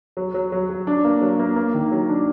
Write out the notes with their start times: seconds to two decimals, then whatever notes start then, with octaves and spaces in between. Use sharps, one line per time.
0.17 F#3
0.34 F#3
0.52 F#3
0.70 F#3
0.87 D4
1.04 A#3
1.21 F#3
1.39 A#3
1.56 A#3
1.74 D#3
1.91 F#3
2.09 D4